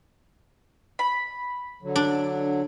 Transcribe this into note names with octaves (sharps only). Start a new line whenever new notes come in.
B5
D3 F#3
D4